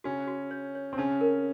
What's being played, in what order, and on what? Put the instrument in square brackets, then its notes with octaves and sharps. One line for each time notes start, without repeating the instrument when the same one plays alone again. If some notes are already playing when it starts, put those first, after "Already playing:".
[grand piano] C#3 C#4 [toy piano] F#4
[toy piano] F#4
C#5
C#5
[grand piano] C4
[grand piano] C#3 C#4 [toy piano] A5
[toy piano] A#4